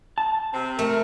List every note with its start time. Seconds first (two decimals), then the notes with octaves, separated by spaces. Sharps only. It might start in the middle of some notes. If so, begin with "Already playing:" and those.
0.18 A5
0.53 C3 C4
0.79 A3 A#4